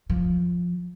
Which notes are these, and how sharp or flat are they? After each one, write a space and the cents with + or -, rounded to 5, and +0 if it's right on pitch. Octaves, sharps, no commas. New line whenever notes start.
F3 +10